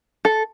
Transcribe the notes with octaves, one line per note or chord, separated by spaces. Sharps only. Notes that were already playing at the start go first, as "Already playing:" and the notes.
A4